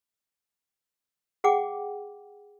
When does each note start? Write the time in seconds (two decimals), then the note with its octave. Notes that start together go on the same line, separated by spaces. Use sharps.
1.44 G#4 F#5 G5 D6